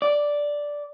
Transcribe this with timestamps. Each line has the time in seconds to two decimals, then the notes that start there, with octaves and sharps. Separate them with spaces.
0.02 D5